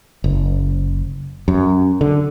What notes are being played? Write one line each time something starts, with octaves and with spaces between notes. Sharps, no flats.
F#1
F#2
D3